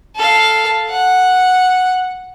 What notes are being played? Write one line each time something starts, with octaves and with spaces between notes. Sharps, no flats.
A4 F5
F#5